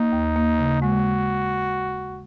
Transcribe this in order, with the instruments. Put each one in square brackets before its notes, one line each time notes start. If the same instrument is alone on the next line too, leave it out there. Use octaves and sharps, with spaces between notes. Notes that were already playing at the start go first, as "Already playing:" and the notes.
Already playing: [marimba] A#3 [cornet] D#4
[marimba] D#2
A#3
C#3
[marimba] G#3 [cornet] F#4